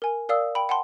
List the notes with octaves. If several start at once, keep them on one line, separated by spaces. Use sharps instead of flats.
A#4 G#5
A#4 D5 F5 D#6 E6
G5 B5
F#5 G5 A5 C6